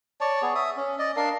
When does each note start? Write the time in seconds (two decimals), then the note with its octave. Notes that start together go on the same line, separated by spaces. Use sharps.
0.21 C#5 D5 A5
0.42 B3 G#4 C#6
0.55 E5 D#6
0.76 C#4
0.99 D5 D#5
1.16 D4 A#4 F5 A5